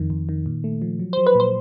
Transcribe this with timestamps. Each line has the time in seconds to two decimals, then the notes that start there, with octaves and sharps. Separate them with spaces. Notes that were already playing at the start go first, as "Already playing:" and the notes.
Already playing: F2 D#3
0.10 F2
0.29 D#3
0.46 A#2
0.64 A3
0.82 F3
0.99 F#3
1.13 C5
1.17 F#3
1.26 B4
1.35 A#2
1.40 C5